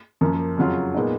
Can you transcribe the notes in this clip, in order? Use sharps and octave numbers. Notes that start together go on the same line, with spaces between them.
F#2 F3 A#3
F2 C#3 F#3 C#4 F4
A#2 G#3 B3 D#4